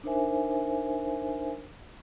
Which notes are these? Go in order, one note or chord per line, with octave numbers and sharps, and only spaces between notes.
D4 D#4 A#4 C5 E5 G#5